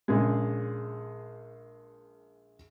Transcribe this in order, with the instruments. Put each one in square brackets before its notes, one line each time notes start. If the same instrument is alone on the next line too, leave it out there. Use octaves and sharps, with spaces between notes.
[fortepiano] A#1 C#3 G#3